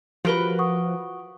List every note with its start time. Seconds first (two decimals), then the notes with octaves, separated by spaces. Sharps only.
0.25 F3 F#4 G4 A#4 B4 D7 G7
0.59 F#5 C#6 D#6